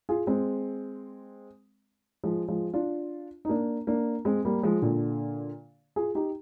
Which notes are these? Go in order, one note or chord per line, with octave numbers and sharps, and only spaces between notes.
F4 G#4
G#3 C4
F3 G#3
F3 G#3
D4 F4
D#4
A#3 D4
A#3 D4
G#3 C4
G3 A#3
F3 G#3
A#2 D3
F4 G#4
D#4 G4